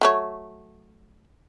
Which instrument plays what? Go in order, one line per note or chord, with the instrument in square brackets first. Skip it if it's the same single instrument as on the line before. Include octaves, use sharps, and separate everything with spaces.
[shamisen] F#3 A3 C#5